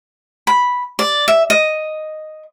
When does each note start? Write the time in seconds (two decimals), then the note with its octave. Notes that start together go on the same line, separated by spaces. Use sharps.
0.47 B5
0.99 D5
1.28 E5
1.50 D#5